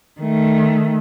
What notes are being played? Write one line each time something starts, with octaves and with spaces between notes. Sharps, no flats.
D#3 A3